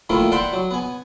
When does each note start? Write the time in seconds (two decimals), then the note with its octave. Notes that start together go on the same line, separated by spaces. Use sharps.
0.10 D#3 F3 A3 A#3 E4
0.32 D5 E5 F#5 G5 B5 C6
0.53 F#3
0.71 B3 G#5